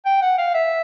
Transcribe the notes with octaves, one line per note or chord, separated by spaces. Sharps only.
G5
F#5
F5
E5